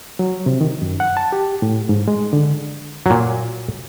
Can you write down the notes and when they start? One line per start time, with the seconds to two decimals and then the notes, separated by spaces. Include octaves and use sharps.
0.19 F#3
0.46 C3
0.61 D#3
0.82 F#2
1.00 F#5
1.17 A5
1.32 G4
1.62 A2
1.89 G#2
2.08 G#3
2.33 D3
3.06 A#2 F#3